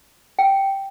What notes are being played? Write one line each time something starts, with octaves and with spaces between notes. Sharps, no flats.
G5